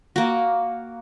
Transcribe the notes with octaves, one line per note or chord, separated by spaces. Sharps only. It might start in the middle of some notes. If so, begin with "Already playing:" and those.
A#3 F#4